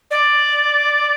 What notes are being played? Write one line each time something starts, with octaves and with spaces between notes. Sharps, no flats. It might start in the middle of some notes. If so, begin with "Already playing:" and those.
D5